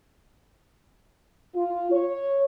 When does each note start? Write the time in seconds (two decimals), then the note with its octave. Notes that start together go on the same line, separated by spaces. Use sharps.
1.55 F4
1.91 C#5